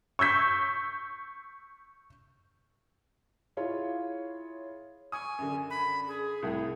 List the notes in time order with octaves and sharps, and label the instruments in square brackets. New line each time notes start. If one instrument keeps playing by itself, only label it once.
[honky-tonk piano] C#6 E6 G6 B6
[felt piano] E4 F4 G#4 C#5
[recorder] G#5 [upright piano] C#6 D#6
[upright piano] F#2 D3
[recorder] B5
G#4
[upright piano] C2 A2